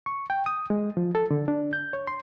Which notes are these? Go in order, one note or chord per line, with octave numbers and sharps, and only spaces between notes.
C#6
G5
D#6
G#3
F3
A4
D3
D4
G6
C#5
C6